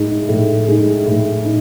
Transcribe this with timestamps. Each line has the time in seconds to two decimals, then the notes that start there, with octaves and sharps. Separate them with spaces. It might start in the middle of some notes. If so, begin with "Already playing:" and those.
Already playing: A2 G#3 D#4
0.29 A2
0.68 G#3 D#4
1.06 A2
1.45 D#4